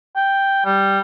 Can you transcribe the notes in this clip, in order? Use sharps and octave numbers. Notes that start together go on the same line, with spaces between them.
G5
G3